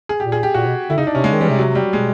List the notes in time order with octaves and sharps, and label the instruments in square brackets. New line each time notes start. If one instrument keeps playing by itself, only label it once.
[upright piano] G#4
[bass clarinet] A#2 [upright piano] G4
[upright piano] G#4
G4
[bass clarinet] A#2 [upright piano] F#4
[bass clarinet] B2
[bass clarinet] D3 [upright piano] E4
[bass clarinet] C#3 [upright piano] D#4
[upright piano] D4
[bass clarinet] C3 [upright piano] C#4
[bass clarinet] C#3 [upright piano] G#3
[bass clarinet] D#3
[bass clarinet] E3 [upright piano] G3
[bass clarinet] C3
[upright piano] F#3
G3
[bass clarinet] B2 [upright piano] G#3